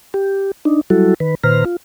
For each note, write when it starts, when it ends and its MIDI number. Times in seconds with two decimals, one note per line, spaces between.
0.14 0.52 67
0.65 0.81 62
0.65 0.81 63
0.90 1.14 54
0.90 1.14 55
0.90 1.14 64
0.90 1.14 66
0.90 1.14 69
1.20 1.35 51
1.20 1.35 71
1.44 1.65 46
1.44 1.65 51
1.44 1.65 71
1.44 1.65 72
1.44 1.65 82
1.44 1.65 89
1.65 1.77 65